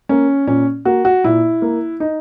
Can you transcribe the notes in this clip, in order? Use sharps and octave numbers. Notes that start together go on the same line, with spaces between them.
A#3 C#4
A#2 C#4
A#3 F#4
F#4
A#2 E4
A#3
D#4